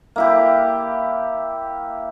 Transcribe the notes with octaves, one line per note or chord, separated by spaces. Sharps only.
A#3 E4 G4